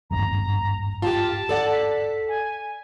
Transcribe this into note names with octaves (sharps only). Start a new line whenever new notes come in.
D#1 G#1 G2 A#5
F4 G4 A5
A4 D5 F#5
B6
G#5